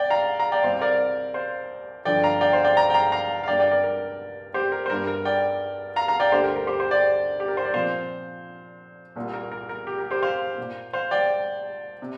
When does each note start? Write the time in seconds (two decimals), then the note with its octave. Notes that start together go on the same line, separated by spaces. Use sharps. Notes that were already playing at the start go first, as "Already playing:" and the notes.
Already playing: D5 G5
0.10 F5 A#5
0.39 F5 A#5
0.52 D5 G5
0.64 C2 C3 G3 C4 C5 F5
0.81 A#4 D5
1.34 C5 F5
2.05 G2 D3 F3 D5 G5
2.23 F5 A#5
2.41 D5 G5
2.53 C5 F5
2.64 D5 G5
2.77 F5 A#5
2.90 G5
2.94 F5 A#5
3.12 F5 A#5
3.43 F5
3.48 G2 G3 A#3 D5 G5
3.59 D5 G5
3.71 A#4 D5
3.83 A#4
4.54 G4 C5
4.72 A#4
4.86 C5
4.90 G2 G3 A#3 A#4
5.07 A#4
5.25 D5 G5
5.96 F5 A#5
6.08 F5 A#5
6.20 D5 G5
6.32 D2 D3 A#3 G4 C5
6.44 A#4
6.56 A#4
6.67 G4 C5
6.79 G4 C5
6.91 D5 G5
7.40 G4
7.48 A#4
7.57 C5
7.65 D5
7.74 A#2 F3 C4 C5 F5
9.16 C2 A#2 G3 A#3
9.33 A#4
9.52 A#4
9.69 A#4
9.87 G4
9.99 A#4
10.11 G4 C5
10.23 C5 F5
10.58 A#2 A#3
10.93 C5 F5
11.11 D5 G5
12.02 C3